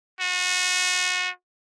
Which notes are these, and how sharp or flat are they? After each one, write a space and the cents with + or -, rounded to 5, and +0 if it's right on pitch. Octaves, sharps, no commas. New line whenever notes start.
F#4 -30